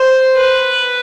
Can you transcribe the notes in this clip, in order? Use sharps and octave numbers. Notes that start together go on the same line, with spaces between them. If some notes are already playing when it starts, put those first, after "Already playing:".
Already playing: C5
B4